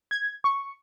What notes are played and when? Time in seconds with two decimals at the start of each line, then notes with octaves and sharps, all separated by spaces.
0.11 G#6
0.44 C#6